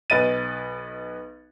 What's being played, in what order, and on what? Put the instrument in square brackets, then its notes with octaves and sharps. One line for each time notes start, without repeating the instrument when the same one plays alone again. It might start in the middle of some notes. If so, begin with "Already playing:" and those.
[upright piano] B1 B4 D#5 A6 D#7